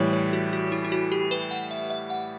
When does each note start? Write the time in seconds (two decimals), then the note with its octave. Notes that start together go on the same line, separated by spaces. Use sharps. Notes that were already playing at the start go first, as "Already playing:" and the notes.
Already playing: A2 E3 G3 A4 C#5
0.13 C#5
0.33 F#4
0.53 F#4
0.72 E4
0.84 E4
0.92 F#4
1.12 G4
1.31 B4
1.51 F#5
1.71 E5
1.90 E5
2.10 F#5